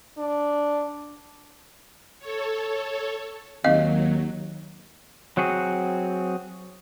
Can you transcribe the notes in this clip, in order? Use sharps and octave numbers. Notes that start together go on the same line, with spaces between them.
D4
A4 C#5
D#2 F#3 C4 D#5 F5
F#3 C4 F#4 G#4